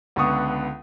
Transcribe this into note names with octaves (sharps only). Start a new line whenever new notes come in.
C#2 D3 B3 C#6 D#6